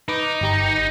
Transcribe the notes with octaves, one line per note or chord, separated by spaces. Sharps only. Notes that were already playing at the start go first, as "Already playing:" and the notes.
D#4 B4 D6
G1 G4 A#5